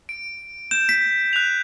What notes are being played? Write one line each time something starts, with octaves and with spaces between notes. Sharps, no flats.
D7
G6 E7
B6
F#6 F7